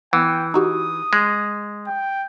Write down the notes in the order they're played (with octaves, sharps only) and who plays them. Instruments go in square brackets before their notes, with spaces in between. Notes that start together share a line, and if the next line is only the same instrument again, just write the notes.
[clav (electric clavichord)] E3 [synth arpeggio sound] B3 [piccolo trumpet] G5
[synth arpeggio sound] D#4 F#4 G4 [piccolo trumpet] D#6
[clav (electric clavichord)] G#3
[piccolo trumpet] G5